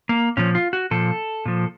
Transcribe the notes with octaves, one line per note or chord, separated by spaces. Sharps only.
A#3
A#2 F3 C#4
F4
F#4
A#2 F3 A4
A#2 F3